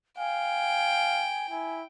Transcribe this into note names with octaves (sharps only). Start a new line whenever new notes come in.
F5 G5 G#5
E4 G#5